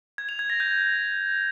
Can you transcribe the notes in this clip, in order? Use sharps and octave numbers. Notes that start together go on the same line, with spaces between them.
G#6
F7
G#6
A#6
G6